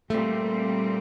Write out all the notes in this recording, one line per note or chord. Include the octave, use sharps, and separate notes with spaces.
A#2 G3 A3 C4